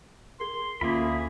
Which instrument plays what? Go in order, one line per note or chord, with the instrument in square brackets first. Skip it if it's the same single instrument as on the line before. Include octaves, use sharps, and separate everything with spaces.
[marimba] G#4 A#4 [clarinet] C6
[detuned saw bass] D2 [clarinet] A#3 [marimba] C#4 F4 [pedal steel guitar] G#4 E5 B5